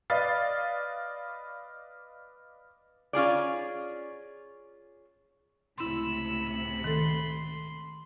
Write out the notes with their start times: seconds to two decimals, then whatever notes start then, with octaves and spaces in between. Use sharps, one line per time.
0.10 B4 D5 D#5 F5 A6
3.13 C#4 F4 G#4 D5
5.78 C#2 A2 C3 E4 B5 C6 E6
6.84 D#3 A4 C6